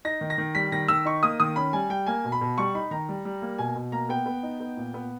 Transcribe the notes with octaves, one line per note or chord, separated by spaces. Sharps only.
D#4 A#6
D#3
A#6
D#3
G3 B6
D#3 A#6
D#3 E6
D#4 C#6
A#3 D#6
D#3 D#6
C#4 B5
G3 G#5
G3 G5
A#3 G#5
B2
B5
B2
G3 C#6
D#4 B5
D#3 A#5
G3
G3
A#3
B2 G#5
B2
A#3 A#5
B3 G5
B3
D#4
B3
A#2
B3